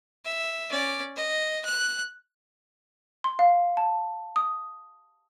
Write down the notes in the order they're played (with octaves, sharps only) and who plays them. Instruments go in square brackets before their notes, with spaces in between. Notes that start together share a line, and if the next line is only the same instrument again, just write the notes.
[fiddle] E5
C#4 D5
D#5
F#6
[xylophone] C6
F5
A5
D#6